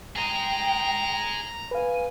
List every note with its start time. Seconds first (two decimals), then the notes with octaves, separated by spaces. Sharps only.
0.16 G#4 D#5 G5 A#5
1.71 B4 F5 G#5